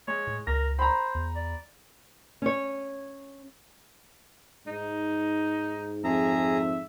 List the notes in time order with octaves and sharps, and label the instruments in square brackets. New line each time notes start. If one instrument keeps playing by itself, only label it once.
[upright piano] G#3 [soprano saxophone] C#5
[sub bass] A2
[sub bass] C#2 [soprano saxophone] A#4 [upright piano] A#6
[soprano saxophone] C5 [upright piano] A#5 B5
[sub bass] E2
[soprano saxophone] D5
[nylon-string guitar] C#4 C#5
[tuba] G#2 [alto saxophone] D#4
[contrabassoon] F2 [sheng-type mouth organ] G#4 A#5 [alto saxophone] E5